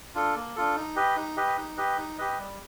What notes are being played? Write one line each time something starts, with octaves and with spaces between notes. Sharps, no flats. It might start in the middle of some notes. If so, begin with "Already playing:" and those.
D4 F4 A4
A#3
D4 F4 A4
D#4
G4 B4 D#5
D#4
G4 B4 D#5
D#4
G4 B4 D#5
D#4
G4 B4 D#5
G3